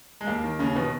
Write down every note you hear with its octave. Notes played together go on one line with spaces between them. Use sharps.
G#3
D#2 A#3
D#3
D#2 C#3 C#4
B2 D#3 B3